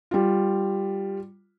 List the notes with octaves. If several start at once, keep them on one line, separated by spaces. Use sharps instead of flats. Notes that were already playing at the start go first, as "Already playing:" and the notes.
G3 F4